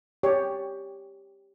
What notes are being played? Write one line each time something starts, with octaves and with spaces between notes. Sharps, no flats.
G4 C#5 D5